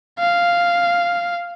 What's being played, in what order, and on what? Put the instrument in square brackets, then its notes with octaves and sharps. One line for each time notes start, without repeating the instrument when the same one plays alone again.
[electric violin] F5